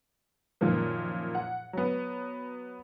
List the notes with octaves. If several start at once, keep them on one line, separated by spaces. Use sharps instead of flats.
F#2 A#2 D#3 F3 A#3
F#5
F#3 B3